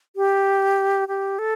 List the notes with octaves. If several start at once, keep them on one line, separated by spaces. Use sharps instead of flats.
G4
G4
A4